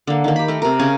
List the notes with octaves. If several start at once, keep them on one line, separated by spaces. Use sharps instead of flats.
D3 A#3
D#3 A#3
G4 B5
A3 A#4
C3 A#4
C#3 C#4 G#5